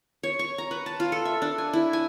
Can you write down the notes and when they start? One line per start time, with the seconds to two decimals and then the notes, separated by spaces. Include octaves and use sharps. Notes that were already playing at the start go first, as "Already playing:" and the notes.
0.23 C#5
0.39 C#6
0.58 A#5
0.71 B4
0.86 A5
1.00 F4
1.12 A4
1.25 E5
1.42 D4
1.58 G#5
1.73 E4
1.93 G#5